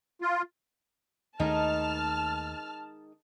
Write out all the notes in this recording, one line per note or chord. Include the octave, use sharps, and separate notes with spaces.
F4
D#2 D#3 G#3 A3 D#4 A5 F6